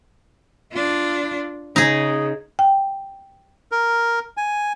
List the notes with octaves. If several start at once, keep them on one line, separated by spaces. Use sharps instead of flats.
D4 F4
C#3 D#4 G#4
G5
A#4
G#5